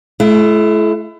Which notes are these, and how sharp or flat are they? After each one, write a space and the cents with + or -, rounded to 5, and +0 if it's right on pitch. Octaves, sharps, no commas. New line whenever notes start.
A3 -40 E4 +30